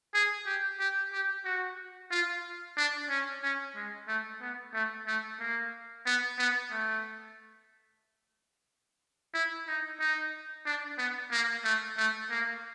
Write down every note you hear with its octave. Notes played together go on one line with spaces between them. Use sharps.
G#4
G4
G4
G4
F#4
F4
D4
C#4
C#4
G#3
A3
B3
A3
A3
A#3
B3
B3
A3
E4
D#4
D#4
D4
B3
A#3
A3
A3
A#3